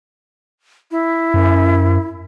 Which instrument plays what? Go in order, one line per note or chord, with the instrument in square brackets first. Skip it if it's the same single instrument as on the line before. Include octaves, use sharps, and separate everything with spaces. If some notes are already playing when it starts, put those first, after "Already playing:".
[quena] E4
[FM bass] F#2